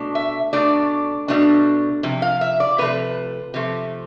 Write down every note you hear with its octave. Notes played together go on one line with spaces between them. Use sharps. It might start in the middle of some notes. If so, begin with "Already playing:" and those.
Already playing: B2 A3 D4
E5
B2 A3 D4 D5
B2 A3 D4
C3 F3
F5
E5
D5
C3 F3 A3 B4
C3 F3 A3